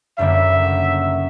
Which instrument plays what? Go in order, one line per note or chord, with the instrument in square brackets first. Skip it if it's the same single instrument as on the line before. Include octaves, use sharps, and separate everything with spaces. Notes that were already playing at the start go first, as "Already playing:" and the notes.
[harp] F#1 F#2 D3 G3 A#3 [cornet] E5